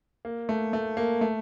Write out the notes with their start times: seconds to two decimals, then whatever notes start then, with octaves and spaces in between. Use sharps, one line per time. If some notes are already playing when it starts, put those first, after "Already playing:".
0.25 A#3
0.49 A3
0.73 A3
0.97 A#3
1.21 A3